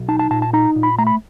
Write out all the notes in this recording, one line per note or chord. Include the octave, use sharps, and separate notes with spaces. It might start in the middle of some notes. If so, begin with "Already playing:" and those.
Already playing: B1
D#4 A5
A5
A#2 A5
A5
D#4 A#5
A#2
B5
A3 A#5
B5